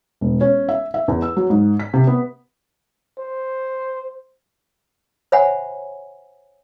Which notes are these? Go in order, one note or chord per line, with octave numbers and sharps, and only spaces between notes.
E1
C#4
E5
E5
E2
E6
F#3
G#2
B6
C3
B3
C5
C5 C#5 E5 F#5 G#5 B5